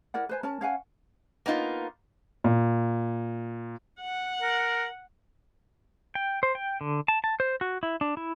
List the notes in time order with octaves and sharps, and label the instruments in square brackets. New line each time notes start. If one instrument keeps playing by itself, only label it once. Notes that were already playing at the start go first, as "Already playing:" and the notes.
[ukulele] E4 A#4 D5 F#5
B4 C5 G#5
C#4 A#4 A5
C#4 F5 F#5 G#5
[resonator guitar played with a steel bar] A#3 B3 D#4 F4
[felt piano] A#2
[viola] F#5
[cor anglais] A#4
[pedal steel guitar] G5
C5
G5
D3
A5
A5
C5
F#4
E4
D4
E4